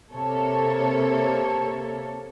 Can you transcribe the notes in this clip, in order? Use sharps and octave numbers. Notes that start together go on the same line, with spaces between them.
C3 A#3 A4 C#5